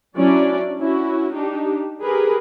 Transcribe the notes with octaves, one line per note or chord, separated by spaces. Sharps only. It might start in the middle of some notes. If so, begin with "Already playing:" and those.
F#3 C#4 D4 E4 D5
C#4 E4 F#4
D4 D#4 G4
G4 G#4 A#4 B4